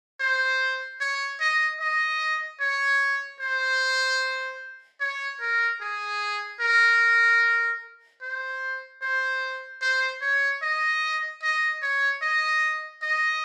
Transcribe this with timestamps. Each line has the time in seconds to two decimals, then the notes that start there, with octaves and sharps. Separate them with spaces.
0.20 C5
1.00 C#5
1.40 D#5
1.80 D#5
2.60 C#5
3.41 C5
5.00 C#5
5.41 A#4
5.81 G#4
6.61 A#4
8.22 C5
9.02 C5
9.81 C5
10.22 C#5
10.62 D#5
11.42 D#5
11.82 C#5
12.22 D#5
13.03 D#5